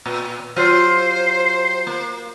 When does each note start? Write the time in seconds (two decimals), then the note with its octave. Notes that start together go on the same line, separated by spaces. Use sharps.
0.06 A#2
0.56 F#3 F4 G4 C5
1.87 A#3